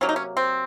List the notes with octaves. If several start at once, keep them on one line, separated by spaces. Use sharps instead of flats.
C3 F#3 A#3 C#4
D#4
C#4
C4